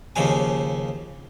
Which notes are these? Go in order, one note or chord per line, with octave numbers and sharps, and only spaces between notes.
D#2 C#3 F3 G#5